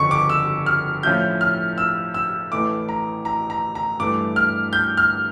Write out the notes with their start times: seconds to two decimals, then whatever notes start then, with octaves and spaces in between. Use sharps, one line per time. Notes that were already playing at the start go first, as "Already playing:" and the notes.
Already playing: G1 F2 C#3 C#6
0.11 D6
0.30 E6
0.66 F6
1.03 A2 F3 C#4 E4 G6
1.41 F6
1.78 E6
2.14 E6
2.52 A1 A2 E3 A3 D6
2.89 A#5
3.25 A#5
3.50 A#5
3.75 A#5
4.00 G2 E3 A3 D6
4.36 F6
4.73 G6
4.97 F6